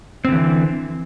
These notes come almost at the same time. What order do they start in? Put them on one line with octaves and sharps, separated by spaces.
C4 D3 E3